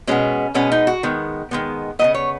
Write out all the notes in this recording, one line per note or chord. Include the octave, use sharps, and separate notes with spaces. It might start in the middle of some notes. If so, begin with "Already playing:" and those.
B2 G#3 B3 C#4
B2 G#3 B3 C#4
D#4
F#4
D#3 G#3 B3
D#3 G#3 B3
F#3 B3 D#5
C#3
C#5